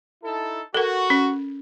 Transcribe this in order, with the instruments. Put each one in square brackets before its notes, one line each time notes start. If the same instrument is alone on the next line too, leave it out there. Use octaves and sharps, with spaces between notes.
[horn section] D#4 E4 A4
[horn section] F#4 [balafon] A4 A#4
[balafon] C#4